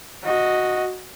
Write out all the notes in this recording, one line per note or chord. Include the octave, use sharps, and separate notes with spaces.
F#4 D#5